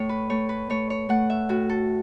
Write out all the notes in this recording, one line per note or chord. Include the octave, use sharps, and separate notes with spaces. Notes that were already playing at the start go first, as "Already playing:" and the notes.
Already playing: A2 A4 C#5
B4
A3 C#5
B4
A3 C#5
C#5
A3 F#5
E5
A2 F#4
A4